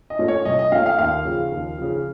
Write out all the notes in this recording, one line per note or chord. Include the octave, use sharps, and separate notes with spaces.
D#5
A#2 A3 C#4
C#5
C2 D#5
D#5
A#2 A3 C#4 F5
F5
D#2 F5
C#3 F3
D#2
C#3 F3